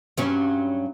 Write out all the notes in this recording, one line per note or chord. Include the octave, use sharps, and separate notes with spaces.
G2 F#3 C#4